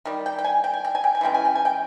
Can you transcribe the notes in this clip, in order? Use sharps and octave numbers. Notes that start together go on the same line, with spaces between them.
D#3 G3
G5
G5
G#5
G5
G#5
G5
G#5
G5
G#5
E3 G#3 C#4 G5
G#5
G5
G#5
G5